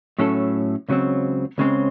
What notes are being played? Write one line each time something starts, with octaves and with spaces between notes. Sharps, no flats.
A2 F#3 C#4 E4 A4
C#2 C#3 F#3 C4
C#2 C#3 G#3 C4